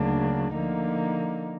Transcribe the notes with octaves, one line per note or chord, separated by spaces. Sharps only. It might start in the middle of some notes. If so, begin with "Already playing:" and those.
Already playing: D2 C#3 F#3 A#3 D4
D3 F3 A#3 D#4